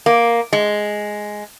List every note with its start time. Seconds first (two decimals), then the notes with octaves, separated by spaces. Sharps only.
0.06 A#3
0.53 G#3